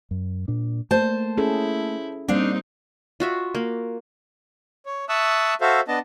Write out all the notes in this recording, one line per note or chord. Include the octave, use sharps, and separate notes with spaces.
F#2
A#2 D4
A3 A#3 C5 A5
C#4 E4 G#4 A4
G3 A#3 C4 D4 D#4 F5
F4 F#4 E5
A#3
C#5
E5 A5 C#6 D#6 E6 F#6
F#4 A4 C5 E5 F5
B3 D4 D#5 A5